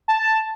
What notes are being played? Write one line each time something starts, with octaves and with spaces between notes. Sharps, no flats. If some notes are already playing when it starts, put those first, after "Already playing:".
A5